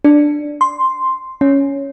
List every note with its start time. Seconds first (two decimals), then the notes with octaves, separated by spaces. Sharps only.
0.05 D4
0.61 C6
1.41 C#4